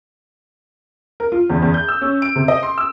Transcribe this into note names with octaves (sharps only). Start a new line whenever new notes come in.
A#4
F4
E2
E2
G6
E6
C#4
D7
C3
D#5
C6
E6